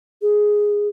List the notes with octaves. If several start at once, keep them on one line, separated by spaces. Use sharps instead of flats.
G#4